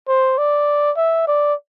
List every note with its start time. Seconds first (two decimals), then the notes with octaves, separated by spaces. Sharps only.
0.08 C5
0.38 D5
0.97 E5
1.27 D5